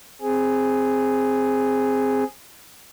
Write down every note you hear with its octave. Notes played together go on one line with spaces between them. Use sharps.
C4 G#4